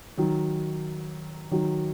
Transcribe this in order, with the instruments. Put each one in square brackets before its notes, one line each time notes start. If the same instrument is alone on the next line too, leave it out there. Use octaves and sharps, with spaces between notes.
[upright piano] D#3 F#3
D#3 F#3